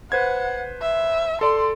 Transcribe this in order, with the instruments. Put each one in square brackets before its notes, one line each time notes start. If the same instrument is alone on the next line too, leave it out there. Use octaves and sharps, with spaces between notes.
[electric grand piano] B4 C5 G#6 [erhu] F#5
[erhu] E5
[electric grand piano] A4 D5 [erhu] C6